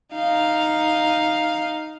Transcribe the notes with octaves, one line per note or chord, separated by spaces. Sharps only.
D#4 F5